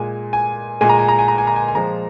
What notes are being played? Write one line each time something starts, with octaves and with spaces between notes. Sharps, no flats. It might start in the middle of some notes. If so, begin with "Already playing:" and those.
Already playing: A#2 G#3 G#5
G#5
A#2 G#3 G#5
A#5
G#5
A#5
G#5
A#5
G#5
A#5
G#5
G#5
A#2 F3 G#3 A#5